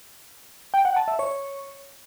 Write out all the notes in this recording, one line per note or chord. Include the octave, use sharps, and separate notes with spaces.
G5
F#5
A5
E5
C#5